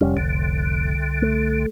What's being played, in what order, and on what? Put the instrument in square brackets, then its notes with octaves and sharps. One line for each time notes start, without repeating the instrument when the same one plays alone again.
[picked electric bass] F1 G3 C#4 [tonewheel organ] F2
[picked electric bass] F1 [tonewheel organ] C2 D3
[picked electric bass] A3